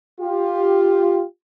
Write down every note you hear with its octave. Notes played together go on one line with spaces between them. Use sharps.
F4 G4